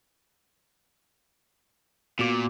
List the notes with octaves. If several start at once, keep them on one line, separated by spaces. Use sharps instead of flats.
A#2 B3 F#4 D6